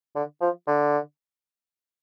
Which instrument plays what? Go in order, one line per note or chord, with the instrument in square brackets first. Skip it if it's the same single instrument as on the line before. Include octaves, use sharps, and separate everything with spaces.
[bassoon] D3
F3
D3